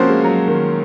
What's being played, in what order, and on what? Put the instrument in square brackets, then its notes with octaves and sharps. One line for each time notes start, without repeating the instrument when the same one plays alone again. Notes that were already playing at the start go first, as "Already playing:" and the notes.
Already playing: [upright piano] F3 C4 F#4 C5 [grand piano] A#3 C#4
[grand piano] G#3
F#3
D#3